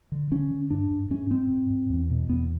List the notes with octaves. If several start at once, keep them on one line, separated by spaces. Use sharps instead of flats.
D3
D3 C#4
D3
G2 D4
G2
G#2 C#4
G#2 C4
G#2
G#2
E2
B2
E2 B3